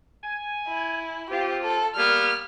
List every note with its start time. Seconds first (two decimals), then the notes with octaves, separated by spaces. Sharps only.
0.23 G#5
0.68 E4
1.30 C4 F4 G4
1.63 A4
1.95 G3 A#3 B3 F6